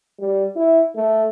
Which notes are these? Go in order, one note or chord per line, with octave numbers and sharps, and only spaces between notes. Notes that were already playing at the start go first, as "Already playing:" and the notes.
G3
E4
A3